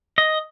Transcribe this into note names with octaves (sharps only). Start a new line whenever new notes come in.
D#5